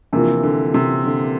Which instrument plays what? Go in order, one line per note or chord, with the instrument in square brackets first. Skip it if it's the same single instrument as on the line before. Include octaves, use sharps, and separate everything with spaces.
[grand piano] C3 E3 [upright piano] F3 A#3 D4 F4 A#4
[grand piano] D3
C3
D3